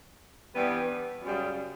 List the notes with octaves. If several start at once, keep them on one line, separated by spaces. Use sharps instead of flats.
G2 E3 G3 B3
F#2 C#3 G3